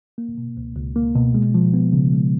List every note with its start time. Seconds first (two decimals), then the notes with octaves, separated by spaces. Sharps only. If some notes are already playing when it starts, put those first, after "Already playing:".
0.18 A#3
0.38 B2
0.57 C#2
0.76 C#2
0.96 A#3
1.16 B2
1.34 G#3
1.55 F3
1.74 B3
1.93 C#3
2.13 G#3